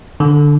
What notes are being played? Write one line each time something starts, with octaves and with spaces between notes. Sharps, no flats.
D3